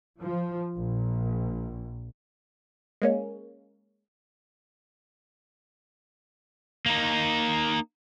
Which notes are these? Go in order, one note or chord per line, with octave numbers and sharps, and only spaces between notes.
F3
A#1
G#3 A#3 C#4
A#3 D#4